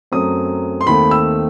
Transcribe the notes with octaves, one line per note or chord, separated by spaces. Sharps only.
F#2 F#3 A3 C4 D#6
C6
D#2 D#3 A3 C4 B5
E6